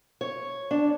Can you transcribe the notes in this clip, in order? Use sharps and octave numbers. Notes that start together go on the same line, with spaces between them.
C#5
D4